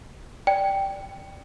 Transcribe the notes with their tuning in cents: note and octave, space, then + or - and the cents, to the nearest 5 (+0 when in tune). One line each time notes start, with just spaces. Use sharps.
D5 +0 G5 +0